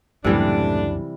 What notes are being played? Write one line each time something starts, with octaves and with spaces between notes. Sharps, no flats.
C#2 F#2 A2 C3 E3 G3 C4 D4